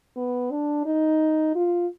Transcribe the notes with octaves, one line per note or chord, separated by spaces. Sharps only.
B3
D4
D#4
F4